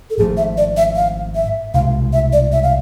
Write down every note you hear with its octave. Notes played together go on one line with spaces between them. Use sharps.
A4
G#1 G#2 F3 A3 G#4
E5
D5
E5
F5
E5
C2 B2 G#3 F5
E5
D5
E5
F5